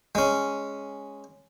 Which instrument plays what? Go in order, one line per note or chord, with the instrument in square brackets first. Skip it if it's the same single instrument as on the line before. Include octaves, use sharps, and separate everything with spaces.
[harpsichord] G#3 C#4